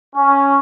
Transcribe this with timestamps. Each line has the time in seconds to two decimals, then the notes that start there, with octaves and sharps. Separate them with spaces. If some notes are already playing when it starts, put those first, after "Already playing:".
0.16 C#4